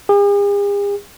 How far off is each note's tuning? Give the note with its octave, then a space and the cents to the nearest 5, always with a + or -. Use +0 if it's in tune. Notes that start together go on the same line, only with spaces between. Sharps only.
G#4 -45